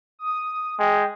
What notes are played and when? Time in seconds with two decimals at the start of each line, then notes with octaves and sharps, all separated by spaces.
0.19 D#6
0.79 G#3 G5